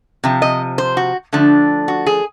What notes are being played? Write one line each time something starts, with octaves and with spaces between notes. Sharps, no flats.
C3 F3
D#5
C5
F#4
D3 F3 A3 D4
F#4
G#4